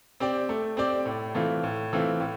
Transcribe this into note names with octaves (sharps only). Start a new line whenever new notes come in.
C4 G4 D5
A3
C4 G4 D5
A2
E3 A3 C4 F4
A2
E3 A3 C4 F4
A2